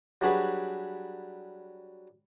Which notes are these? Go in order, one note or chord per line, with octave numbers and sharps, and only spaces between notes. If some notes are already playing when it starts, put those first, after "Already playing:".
F#3 G3 D4 F#4 G#4 B4